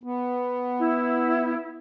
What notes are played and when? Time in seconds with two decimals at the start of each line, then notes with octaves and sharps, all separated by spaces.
0.03 B3
0.79 E4